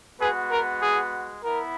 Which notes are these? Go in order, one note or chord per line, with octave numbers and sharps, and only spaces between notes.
G#3 B3 F#4 G#4 B4
A#4
G#4
B3 E4 A#4